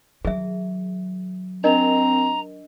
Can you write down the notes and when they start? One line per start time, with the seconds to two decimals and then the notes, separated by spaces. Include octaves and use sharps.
0.25 D#3 F#3 G#4 E5
1.64 C4 D4 A#4 D#5 A#5